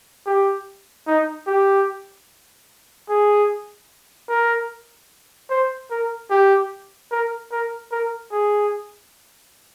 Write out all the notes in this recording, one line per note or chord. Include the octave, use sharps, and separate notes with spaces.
G4
D#4
G4
G#4
A#4
C5
A#4
G4
A#4
A#4
A#4
G#4